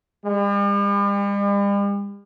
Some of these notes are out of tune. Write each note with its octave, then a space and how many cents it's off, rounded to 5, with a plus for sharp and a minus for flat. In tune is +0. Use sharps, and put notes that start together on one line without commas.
G3 +45